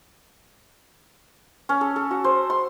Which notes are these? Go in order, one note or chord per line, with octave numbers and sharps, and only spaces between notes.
C#4
A4
A4
F#4
C5
C6